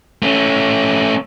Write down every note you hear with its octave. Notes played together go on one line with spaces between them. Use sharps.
A3 C#4